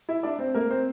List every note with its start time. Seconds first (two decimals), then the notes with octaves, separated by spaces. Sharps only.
0.09 E4 E5
0.23 D4 D5
0.39 C4 C5
0.54 A#3 A#4
0.70 C4 C5